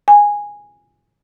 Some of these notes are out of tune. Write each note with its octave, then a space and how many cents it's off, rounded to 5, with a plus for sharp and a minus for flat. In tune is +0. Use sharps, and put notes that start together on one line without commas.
G#5 -10